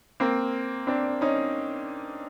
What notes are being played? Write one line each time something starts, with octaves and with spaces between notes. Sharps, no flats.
A#3 C4
C4 D4
C#4 D#4